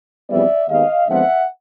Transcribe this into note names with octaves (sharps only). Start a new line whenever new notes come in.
F2 C#3 E3 G3 B3 D5 E5
D#2 D#3 G#3 B3 D#5 F5
F2 D3 F3 G#3 B3 E5 F#5